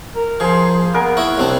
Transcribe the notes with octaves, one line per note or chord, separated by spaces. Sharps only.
A#4
F3 G#4 C5
A#3
B3 A#4 G#5
E4 C#5
C2 C4 D4 C#5